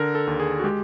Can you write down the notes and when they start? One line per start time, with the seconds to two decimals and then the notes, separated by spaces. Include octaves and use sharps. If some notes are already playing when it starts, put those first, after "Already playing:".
Already playing: D3 A#4
0.15 A4
0.27 D#2
0.40 G#4
0.59 F#4
0.64 G#3 G4